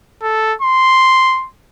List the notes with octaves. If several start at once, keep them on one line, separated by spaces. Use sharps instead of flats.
A4
C6